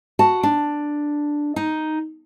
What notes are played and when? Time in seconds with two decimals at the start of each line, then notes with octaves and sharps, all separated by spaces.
0.19 F#4 A5
0.43 D4
1.56 D#4